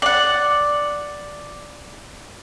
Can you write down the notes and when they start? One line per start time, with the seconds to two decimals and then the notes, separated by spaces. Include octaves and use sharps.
0.02 D5 F#5